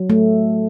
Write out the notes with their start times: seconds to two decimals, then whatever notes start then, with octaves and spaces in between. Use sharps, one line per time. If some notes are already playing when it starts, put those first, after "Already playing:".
Already playing: F#3
0.10 A3